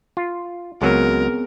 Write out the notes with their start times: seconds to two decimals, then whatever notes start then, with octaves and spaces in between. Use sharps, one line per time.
0.17 F4
0.82 C#2 F#3 B3 C4 G#4 A#4